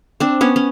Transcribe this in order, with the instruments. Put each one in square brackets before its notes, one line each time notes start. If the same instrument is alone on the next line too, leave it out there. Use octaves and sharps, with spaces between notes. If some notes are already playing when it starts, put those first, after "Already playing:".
[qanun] C4 D4
B3 C#4
C#4